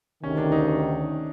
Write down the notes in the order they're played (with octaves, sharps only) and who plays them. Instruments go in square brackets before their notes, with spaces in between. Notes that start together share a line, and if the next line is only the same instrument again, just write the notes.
[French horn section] D2 C3 D#3 [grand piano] C#4
[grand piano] D4
D#4